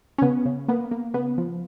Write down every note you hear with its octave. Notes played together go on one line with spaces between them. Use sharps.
C#4
C#3 B3
C#3
A#3 B3
A#3
C#3 B3
F3